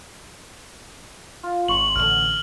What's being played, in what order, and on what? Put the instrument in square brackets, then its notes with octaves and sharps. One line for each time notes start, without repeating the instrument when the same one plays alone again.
[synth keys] F4
[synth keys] G#1 C6 C#6 [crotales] F#7
[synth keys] A1 D3 [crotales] F6 F#7